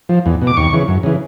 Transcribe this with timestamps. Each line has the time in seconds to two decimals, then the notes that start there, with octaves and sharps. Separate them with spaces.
0.09 F3
0.26 E2
0.41 B2
0.47 D6
0.57 D#2 C#6
0.73 C#3 E3
0.88 F#2
1.03 C#3 E3